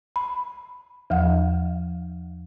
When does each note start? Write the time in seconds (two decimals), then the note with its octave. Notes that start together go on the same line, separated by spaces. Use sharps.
0.16 B5
1.10 E2 F3 F5 F#5